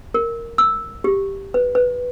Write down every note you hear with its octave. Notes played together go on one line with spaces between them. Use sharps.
A#4
E6
G4
B4
B4